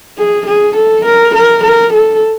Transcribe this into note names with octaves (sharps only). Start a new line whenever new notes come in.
G#4
G#4
A4
A#4
A#4
A#4
A4